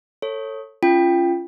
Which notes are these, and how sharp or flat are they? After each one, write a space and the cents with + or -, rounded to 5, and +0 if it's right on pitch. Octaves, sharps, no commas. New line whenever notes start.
A4 +20 C#5 -15
C#4 +0 F4 -20 G5 +0